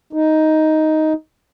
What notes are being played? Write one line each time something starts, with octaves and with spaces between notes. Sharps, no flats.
D#4